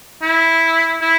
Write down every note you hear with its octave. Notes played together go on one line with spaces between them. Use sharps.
E4
E4